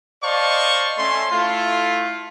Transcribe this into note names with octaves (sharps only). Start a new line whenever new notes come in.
C5 D5 D#5 F5 A5 C#6
A3 C#4 C6
A3 E4 F4